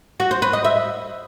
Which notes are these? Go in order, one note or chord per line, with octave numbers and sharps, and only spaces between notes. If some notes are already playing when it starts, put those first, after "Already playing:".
F#4
C5
B4
D#5
E5